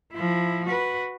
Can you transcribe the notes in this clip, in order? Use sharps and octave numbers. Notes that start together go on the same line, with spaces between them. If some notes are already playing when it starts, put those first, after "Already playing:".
F3 E4
F#4 B4